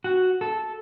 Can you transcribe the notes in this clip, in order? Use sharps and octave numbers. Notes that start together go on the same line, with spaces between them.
F#4
A4